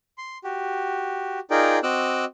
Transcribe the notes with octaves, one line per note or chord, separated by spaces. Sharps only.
C6
F#4 G4
D#4 F4 G#4 A#4 D5 G5
C4 F#4 D#5 D6 E6 F#6